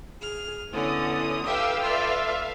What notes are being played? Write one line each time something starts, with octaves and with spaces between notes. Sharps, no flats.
G#4 F6
D3 B3 C#4 E4 D#6
G4 A4 B4 E5 F5 G5 E6
F4 D5 E5 F5